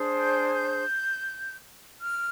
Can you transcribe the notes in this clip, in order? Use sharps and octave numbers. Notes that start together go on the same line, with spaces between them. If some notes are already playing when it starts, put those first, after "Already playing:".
Already playing: D4 G#4 C5
G6
G#6
G6
F6